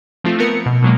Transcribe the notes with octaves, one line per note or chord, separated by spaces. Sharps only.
F3 A3 C4 F4
B3 C4 A#4 C#7
B2
B2 F#3 G#3 A#3